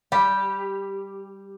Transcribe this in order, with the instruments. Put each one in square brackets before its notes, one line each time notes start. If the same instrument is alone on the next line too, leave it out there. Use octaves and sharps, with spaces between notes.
[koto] G3 G4